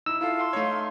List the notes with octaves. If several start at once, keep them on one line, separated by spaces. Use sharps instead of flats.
D#4 E4 E6
E4 F4 A4 F5
C6
A3 D#4 C#5